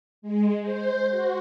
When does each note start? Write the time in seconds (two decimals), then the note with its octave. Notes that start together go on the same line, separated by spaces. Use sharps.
0.22 G#3
0.62 C5
1.08 F#4